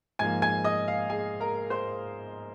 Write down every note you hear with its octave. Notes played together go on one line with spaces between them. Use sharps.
G#2 F3 A#3 G#5 G#6
G#5 G#6
D#5 D#6
F5
G#4 G#5
A#4 A#5
C5 C6